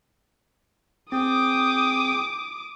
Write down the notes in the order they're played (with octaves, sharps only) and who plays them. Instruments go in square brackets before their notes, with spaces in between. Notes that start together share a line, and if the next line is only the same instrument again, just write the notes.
[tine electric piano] C4 [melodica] G#4 G5 [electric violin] D6 D#6